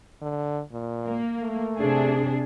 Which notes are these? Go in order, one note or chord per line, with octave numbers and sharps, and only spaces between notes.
D3
A#2
A#3
A3
C3 D4 G#4